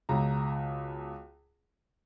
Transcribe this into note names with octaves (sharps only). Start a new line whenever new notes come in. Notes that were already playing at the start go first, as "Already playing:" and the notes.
C#2 B2 A#5